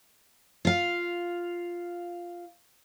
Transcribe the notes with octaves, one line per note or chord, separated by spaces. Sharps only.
F4 F5